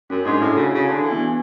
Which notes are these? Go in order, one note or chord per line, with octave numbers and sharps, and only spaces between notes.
F#2 C#4
G#2 D4
A2 E4
C#3 F#4
F#4
C#3
D3 D4
E3
B3